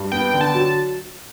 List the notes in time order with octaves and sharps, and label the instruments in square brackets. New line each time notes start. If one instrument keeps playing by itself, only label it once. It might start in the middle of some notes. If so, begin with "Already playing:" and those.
Already playing: [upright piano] G2
[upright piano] B3 [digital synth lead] G5
[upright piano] D3
[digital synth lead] A5
[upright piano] F#3